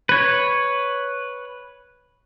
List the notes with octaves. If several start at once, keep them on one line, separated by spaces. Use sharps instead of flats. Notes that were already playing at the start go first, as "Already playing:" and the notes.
B4 C#5